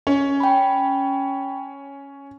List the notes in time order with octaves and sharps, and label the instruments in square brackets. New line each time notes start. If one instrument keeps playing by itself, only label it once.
[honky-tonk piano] C#4
[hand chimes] G5 B5